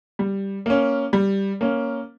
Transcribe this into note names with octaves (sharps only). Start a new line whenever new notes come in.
G3
A#3 C#4
G3
A#3 C#4